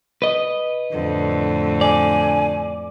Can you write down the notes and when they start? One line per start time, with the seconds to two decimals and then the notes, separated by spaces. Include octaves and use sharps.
0.22 B4 D#5
0.93 F2 A2 D3
1.81 D5 G#5